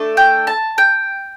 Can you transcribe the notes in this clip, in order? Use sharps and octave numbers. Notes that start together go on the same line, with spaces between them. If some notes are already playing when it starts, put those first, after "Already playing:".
Already playing: A3 D4 A4
G5
A5
G5